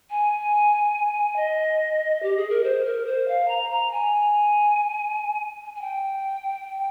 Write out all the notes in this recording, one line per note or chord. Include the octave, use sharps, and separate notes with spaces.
G#5
D#5
G4
G#4
A#4
C5
A#4
C5
F5
A#5
A#5
G#5
G#5
G5